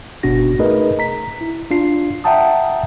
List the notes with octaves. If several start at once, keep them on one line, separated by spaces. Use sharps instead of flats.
G1 B2 C#4 D4 F#4 A#6
A3 D#4 G#4 A#4 B4 D#5
A#5 B6
E4
D4 F4 C7
E5 F#5 G5 A5 A#5 D#6